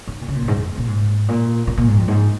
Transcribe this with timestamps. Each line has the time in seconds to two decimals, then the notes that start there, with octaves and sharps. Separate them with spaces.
0.07 D#3
0.21 A#2
0.28 C#3
0.34 A#2
0.42 F2
0.48 G#2
0.58 F2
0.78 A#2
0.88 G#2
1.28 A#2
1.67 A#2
1.77 A#2
1.88 G#2
1.98 F2
2.08 G#2